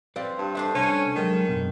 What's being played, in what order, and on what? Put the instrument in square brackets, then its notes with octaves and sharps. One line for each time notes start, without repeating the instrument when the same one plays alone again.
[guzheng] C4 [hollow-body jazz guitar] B4 D5 F5
[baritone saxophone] G2
[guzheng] A3 D4 C5 [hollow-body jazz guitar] E5
[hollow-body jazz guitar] C2 [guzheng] A3 [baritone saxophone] C#4
[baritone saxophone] D#3 [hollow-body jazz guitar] F#3 G#3 D#4
[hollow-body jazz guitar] F#2 B2